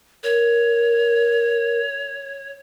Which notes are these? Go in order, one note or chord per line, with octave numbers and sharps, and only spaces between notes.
A#4 C#5